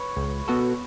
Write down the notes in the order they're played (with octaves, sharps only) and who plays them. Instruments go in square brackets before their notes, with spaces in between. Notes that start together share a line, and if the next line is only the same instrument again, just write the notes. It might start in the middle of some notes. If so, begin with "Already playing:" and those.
Already playing: [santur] B4 C#5
[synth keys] C#2
B2 B3 F#4 A4